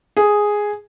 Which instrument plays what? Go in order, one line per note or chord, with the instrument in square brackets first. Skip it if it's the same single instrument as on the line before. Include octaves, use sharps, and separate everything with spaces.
[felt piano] G#4